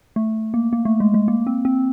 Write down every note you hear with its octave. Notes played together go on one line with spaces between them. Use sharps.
A3
A#3
A#3
A3
G#3
G#3
A#3
C4
C4